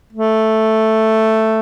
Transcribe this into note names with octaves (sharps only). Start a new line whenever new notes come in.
A3